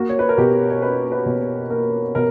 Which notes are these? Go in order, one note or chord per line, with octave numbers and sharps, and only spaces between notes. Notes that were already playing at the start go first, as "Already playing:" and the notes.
Already playing: A#3 F#4
C#5
B4
A#4
B2 G4
C#5
C#4 B4
B4
B2
C#5
A#3 A#4
B2 A#4